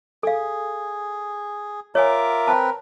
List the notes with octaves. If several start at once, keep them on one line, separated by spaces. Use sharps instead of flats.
G#4 A4 F5
F4 A#4 C#5 E5 G#5 D6
C4 B4 A5